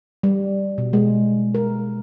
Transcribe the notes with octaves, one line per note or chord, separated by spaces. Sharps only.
G3
B2
G#3
A#4